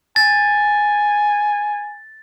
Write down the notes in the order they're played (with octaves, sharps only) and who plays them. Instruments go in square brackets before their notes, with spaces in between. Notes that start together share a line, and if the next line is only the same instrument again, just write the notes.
[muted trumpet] G#5 [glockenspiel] A6